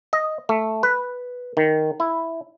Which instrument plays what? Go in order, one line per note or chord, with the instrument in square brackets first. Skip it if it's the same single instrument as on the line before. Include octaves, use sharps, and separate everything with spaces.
[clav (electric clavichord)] D#5
A3
B4
D#3
E4